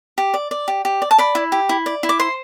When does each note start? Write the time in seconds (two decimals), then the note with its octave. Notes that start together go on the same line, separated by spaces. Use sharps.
0.18 G4
0.34 D5
0.51 D5
0.68 G4
0.85 G4
1.02 D5
1.11 A5
1.18 D5 B5
1.35 E4
1.52 G4
1.69 E4
1.86 D5
2.03 E4
2.09 D6
2.19 C5 C6